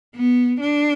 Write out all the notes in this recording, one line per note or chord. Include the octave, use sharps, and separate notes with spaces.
B3
D4